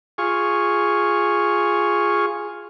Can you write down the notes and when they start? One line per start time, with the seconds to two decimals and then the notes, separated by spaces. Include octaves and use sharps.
0.18 F4 G#4 C#6